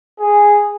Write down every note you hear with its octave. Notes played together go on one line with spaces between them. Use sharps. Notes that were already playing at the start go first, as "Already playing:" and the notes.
G#4